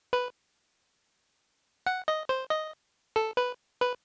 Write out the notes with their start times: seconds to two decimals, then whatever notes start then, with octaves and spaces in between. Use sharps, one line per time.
0.13 B4
1.86 F#5
2.08 D#5
2.29 C5
2.50 D#5
3.16 A4
3.37 B4
3.81 B4